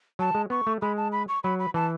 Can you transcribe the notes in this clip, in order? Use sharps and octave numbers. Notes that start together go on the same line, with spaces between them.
F#3 A5
G#3
B3 C#6
A3
G#3 B5
A5
B5
C#6
F#3 B5
B5
E3 A5